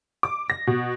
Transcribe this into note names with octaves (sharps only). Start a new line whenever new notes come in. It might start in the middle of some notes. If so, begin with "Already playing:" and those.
D6
A#6
B2